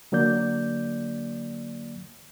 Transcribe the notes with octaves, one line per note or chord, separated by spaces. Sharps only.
D3 F#3 A#3 D5 G6